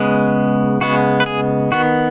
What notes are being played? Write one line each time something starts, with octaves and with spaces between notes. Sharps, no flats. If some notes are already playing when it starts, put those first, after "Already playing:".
Already playing: C#3 G#3 B3
C#3 G#3 B3 F#4
B4
G#4
D#3 B3 F#4